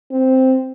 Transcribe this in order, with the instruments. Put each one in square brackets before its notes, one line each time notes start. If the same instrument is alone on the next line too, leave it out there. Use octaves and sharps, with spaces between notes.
[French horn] C4